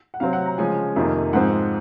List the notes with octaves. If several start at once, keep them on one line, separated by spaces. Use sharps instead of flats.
F#5
C3 F#3 C4 F5
F#5
A#5
C#3 F3 G#3 C#4 G#5
F2 C3 D#3 A#3
G#2 F3 C4 F#5